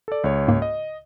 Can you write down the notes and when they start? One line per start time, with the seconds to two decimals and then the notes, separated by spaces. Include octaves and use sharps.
0.08 A4 D5
0.24 C#2 C#5
0.48 G#2 A#3
0.62 D#5